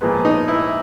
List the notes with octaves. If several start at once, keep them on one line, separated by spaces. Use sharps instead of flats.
A#2 F3 G#3 B3
D#4
E4